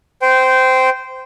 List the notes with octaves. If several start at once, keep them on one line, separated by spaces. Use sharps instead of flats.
C5 G5